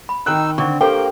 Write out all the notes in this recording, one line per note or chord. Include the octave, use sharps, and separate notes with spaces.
B5
D#3 D#4 G5 E6 F#6
D3 C4 C#6
A#3 G4 A4 A#4 C5 G5